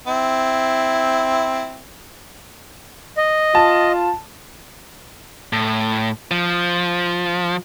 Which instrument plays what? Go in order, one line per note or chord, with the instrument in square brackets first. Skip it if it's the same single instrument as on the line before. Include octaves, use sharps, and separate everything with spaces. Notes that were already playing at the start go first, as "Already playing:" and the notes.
[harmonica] C4 E4
[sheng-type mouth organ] D#5
[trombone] F4 [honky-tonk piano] A5
[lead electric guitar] A2
F3